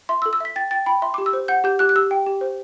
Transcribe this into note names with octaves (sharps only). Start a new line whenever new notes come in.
E5 C6
E6
A4
E6
E5 B6
G5 A6
G5 A6
G5 B5
E5 C6
D6
G4
E6
C5
F#5 G6
G4 G6
G4 F#6
F#6
G4 E6
G5
G4
C5